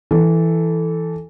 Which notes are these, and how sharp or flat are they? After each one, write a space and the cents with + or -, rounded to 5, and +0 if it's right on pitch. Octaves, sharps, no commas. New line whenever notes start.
E3 +0 A4 +0